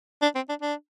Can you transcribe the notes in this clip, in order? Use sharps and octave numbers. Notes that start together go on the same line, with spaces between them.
D4
C4
D4
D4